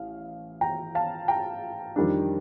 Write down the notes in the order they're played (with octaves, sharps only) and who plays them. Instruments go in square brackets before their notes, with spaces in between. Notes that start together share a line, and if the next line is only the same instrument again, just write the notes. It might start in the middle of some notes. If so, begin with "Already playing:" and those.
Already playing: [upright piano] A1 F5
G5 A#5
F5 A5
G5 A#5
F2 D#3 G3 D4